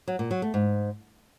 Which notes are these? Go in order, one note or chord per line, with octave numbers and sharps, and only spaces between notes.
F#3
A#2
F#3
A3
G#2